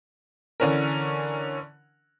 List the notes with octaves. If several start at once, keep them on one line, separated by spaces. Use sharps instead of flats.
D3 E3 C#4 D4 A#4